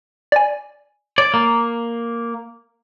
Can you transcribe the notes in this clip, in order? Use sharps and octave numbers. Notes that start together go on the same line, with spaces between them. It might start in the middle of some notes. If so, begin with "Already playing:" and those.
D5 G#5
C#5 D5
A#3